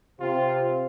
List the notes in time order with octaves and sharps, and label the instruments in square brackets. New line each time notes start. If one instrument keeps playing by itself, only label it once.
[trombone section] C3 C4 [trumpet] F4